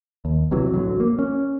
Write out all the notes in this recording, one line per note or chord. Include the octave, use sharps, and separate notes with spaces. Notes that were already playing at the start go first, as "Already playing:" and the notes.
D#2
B1 C3 E3 F#3
A1 D2 F#3
A#3
C#4